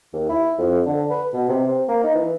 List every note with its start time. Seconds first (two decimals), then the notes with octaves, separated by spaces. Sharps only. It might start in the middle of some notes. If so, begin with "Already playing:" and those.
0.13 D#2
0.29 E4
0.59 F2
0.86 D3
1.11 B4
1.33 B2
1.49 C3
1.67 C4
1.88 A#3
2.03 D#4
2.14 E3